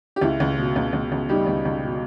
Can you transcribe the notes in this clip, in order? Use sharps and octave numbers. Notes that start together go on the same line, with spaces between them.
G4
C#2 E4
C#2
B2
C#2
C#2
C#2
G3 D#4 G4
C#2
C#2
B2